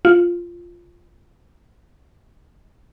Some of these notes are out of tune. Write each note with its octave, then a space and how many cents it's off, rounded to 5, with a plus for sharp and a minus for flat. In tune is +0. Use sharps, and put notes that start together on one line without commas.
F4 -5